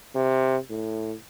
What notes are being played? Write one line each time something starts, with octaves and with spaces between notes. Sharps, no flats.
C3
A2